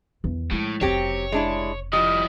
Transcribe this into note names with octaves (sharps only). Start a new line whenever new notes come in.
E2 D#3
A2 F3 G#3
F1 C#3 F#3 C4 G4 C#5
G#3 D4 E4
F3 G3 E4 D#5